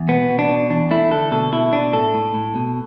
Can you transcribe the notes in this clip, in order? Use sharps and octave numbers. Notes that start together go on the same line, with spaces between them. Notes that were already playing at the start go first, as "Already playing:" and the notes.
Already playing: E2
B2 B3
B2
D4
B2
E2 D4
A3 E4
D3 A4
B2 A4
B2 E4
B2 D4
A2 A4
A2
A2
B2